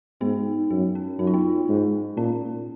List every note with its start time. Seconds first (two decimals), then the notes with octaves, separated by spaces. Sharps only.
0.21 G#2 B3 D#4
0.70 F#2 B3
0.95 C#4
1.19 F#2 D#4
1.27 F4
1.34 B3 D#4
1.68 G#2
2.17 A#2 C#4